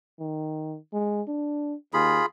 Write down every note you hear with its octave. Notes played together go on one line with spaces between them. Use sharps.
D#3
G#3
D4
D#2 F4 G#4 B5